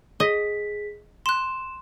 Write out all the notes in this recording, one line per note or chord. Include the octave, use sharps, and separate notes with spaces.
G#4 D#5 B6
C6 F#6 E7